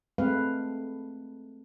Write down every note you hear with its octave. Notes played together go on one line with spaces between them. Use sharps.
G#3 A3 C4 B4 F5